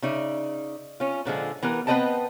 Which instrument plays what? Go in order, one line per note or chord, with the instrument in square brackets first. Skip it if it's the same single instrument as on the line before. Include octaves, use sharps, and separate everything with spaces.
[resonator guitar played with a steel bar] C#3 D#4 D5 E5
C#4 F4
A#2 D3 F3 G#3
E3 B3 G4 A#4
B3 C4 B4 D#5 G5 A5